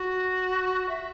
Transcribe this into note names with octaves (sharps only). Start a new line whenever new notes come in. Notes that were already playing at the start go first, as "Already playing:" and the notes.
Already playing: F#4
E5